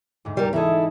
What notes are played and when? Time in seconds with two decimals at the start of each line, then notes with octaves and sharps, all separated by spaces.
0.25 D2 G#2
0.37 G3 A#4
0.53 E3 D#4 E4 G#4 A4